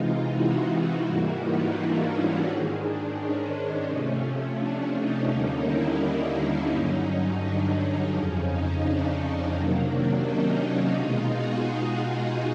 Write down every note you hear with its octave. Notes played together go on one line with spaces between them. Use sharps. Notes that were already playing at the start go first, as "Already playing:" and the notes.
Already playing: C3 E3 G#3 D#4 F4
E4 F#4
E4 F#4
G#2 E3 G3 A#3 E4 F#4
D#4 F4
D4 E4
C#4
G#2 D#3 G#3
D4
C#4
C3 F3 A3 C#4
D4
C#4 D#4
D#2 D3 G3 A#3
D4 E4
C#4 D#4
G2 D3 F#3
D4
F2 C#3 F3 C#4
C#4 D#4
D4
C3 D#3 F#3 A#3
D4
C#4 D#4
B2 G#3 D#4 F4
F#4 G#4